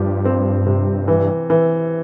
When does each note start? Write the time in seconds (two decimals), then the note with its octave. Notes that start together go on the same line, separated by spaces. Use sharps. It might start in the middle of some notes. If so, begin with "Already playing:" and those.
Already playing: G2 F3 G4
0.25 C4
0.66 C3
1.08 E3
1.50 E3